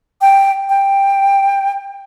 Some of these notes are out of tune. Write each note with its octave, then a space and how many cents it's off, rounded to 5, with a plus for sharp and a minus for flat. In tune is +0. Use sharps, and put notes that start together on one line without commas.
G5 +5
G5 +10